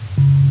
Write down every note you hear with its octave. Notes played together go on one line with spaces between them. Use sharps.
C#3